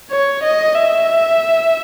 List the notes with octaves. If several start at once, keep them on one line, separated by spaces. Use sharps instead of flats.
C#5
D#5
E5